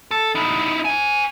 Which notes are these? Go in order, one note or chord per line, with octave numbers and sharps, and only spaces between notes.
A4
D#4 E4
C5 G#5